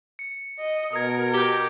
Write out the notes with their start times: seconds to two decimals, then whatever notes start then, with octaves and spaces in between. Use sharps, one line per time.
0.19 C#7
0.59 D#5
0.93 B2 A#4 D#6 G#6
1.34 G4 G6 G7